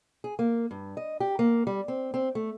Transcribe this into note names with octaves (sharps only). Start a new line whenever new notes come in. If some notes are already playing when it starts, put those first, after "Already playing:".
G#4
A#3
G2
D#5
G4
A#3
G3
C4
C4
A3